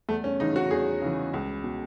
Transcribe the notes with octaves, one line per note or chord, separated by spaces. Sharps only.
E2 A3
C#4
C#3 E3 D#4
F#4
E2 G#4
C#3 E3
C#2
B2